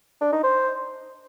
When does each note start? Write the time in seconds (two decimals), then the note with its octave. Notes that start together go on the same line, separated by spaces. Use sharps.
0.21 D4
0.32 D#4
0.43 C5